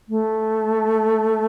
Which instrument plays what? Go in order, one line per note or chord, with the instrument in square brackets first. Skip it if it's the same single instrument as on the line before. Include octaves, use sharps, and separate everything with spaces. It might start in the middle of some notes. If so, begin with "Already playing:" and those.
[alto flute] A3